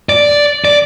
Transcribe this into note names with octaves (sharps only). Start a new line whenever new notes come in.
D5
D5